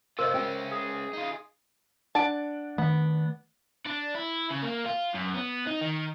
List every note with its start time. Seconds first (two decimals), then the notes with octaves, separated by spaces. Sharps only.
0.19 C3 F4 A#4 C5 D#5
0.34 G#3 C#4 E5 G5
0.72 G#4
1.13 D#4 F4
2.15 D4 F#5 A5 D7
2.78 D#3 A3 B3
3.86 D4
4.15 E4
4.50 C#3
4.62 A#3
4.85 F4
5.14 F#2
5.34 B3
5.67 D#4
5.81 D#3